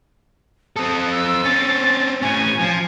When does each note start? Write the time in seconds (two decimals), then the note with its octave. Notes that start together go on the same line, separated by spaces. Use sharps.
0.76 C4 A4 D#6
1.12 E6
1.44 C4 C#4 A6
2.22 A2 C#4 G#5
2.60 F3